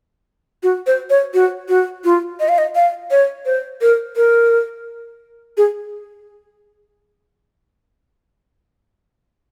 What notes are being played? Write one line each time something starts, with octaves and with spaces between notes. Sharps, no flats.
F#4
C5
C#5
F#4
F#4
F4
D#5
F5
D#5
F5
C#5
C5
A#4
A#4
G#4